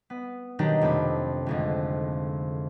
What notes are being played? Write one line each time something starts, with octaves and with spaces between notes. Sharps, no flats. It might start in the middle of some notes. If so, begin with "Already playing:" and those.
B3
B2 D#3 F#3 D4 D#4 G4
F2 C3 A3 B5 D6
G#1 F2 D3